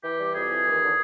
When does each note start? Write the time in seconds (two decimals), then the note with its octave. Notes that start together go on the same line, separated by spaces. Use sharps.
0.03 E3 G4
0.19 G3
0.34 F2 G#4
0.50 E3
0.65 D#2
0.82 D3